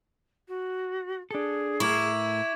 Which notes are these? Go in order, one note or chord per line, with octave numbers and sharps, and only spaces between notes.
F#4
D4 G#4 A4
A2 E4 A#4 C#6 D6 G#6